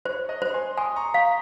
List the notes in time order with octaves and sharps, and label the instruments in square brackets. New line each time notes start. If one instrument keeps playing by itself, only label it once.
[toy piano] C5 [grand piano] C#5
[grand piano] D#5
[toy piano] C5
[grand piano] G#5 C6
[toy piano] G#5 [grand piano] C6 D#6
[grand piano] A#5 C#6
[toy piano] F5 [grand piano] G5 A#5